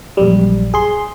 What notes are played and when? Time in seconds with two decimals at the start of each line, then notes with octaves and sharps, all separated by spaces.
0.17 A#1 F#2 G3
0.74 G#4 C6